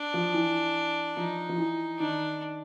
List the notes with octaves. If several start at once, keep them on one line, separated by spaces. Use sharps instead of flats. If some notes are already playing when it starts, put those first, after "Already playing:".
Already playing: D4
F3
E3
F3 D#4
F3
E3
D#3 D4